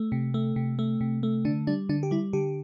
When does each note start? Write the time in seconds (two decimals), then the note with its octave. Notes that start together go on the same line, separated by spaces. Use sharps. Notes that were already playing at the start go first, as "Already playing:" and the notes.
Already playing: A3
0.12 C3
0.34 A3
0.56 C3
0.79 A3
1.01 C3
1.23 A3
1.45 D3 D4
1.67 G3 D4
1.89 D3 D4
2.03 G4
2.11 G3 E4
2.33 D3 G4